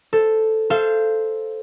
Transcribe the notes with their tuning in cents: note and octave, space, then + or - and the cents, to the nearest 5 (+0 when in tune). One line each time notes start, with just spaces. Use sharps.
A4 +0 C5 +0
A4 +0 C5 +0 F5 -25